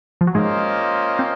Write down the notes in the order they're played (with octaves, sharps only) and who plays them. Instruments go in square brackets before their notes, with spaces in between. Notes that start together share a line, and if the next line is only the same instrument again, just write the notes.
[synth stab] F3
F#3
[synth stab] G#2 G#3 [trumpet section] A#3 C#4 F4 C5 D#5
[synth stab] C4